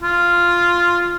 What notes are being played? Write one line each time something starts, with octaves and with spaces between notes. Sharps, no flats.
F4